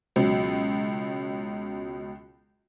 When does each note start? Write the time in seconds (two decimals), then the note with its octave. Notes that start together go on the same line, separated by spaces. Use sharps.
0.16 C#2 B2 F#3